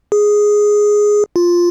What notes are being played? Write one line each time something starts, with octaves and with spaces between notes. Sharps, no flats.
G#4
F4